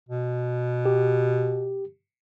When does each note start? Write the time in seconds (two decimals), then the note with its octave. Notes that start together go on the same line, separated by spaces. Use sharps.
0.09 B2
0.86 G4